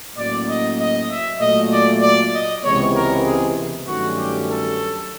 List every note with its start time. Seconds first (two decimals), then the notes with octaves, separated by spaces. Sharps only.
0.17 A2 F#3 A#3 C#4 D5
0.47 D#5
0.79 D#5
1.09 E5
1.40 A#2 F#3 A3 D#5
1.71 D5
2.01 D5
2.33 D#5
2.63 C#2 C3 E3 G#3 B3 C#5
2.94 A#4
3.24 G#4
3.86 G2 D#3 F#3 A3 C#4 F#4
4.17 G4
4.48 A4